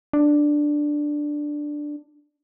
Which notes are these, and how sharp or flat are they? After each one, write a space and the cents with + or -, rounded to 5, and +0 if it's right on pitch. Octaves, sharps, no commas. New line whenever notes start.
D4 +5